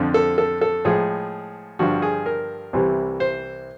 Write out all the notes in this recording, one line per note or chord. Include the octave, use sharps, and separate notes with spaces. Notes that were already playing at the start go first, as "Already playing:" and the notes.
Already playing: F2 D3 F3
A4
A4
A4
A2 F3 G#3 G#4
G2 D3 F3 F#4
G#4
A#4
C2 C3 E3 G3
C5